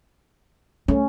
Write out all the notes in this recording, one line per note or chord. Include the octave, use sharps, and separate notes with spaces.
A3 C#4